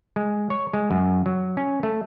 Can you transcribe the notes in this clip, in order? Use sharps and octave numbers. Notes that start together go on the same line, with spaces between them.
G#3
C#5
G#3
F#2
F#3
C#4
A3